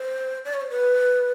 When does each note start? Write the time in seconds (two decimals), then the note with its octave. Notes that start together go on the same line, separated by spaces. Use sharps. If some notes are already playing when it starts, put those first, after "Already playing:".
Already playing: C5
0.44 D5
0.54 C#5
0.61 C5
0.70 B4